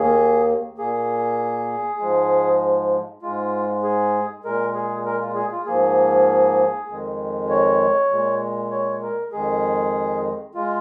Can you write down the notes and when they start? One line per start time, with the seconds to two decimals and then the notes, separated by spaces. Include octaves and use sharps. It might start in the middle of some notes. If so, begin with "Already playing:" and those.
Already playing: D#2 D#3 A#3 G#4
0.78 A#2 A#3 G#4
2.00 G#2 F3 G#3
3.22 G#2 G#3 F4
3.83 G#4
4.44 A#2 G#3 A#4
4.75 G#4
5.05 A#4
5.21 F4
5.35 G#4
5.52 F4
5.66 G#2 F3 A#3 G#4
6.88 F2 D#3 G#3
7.50 C#5
8.11 A#2 G#3
8.71 C#5
9.03 A#4
9.32 F2 D#3 G#3 G#4
10.55 G#3 F4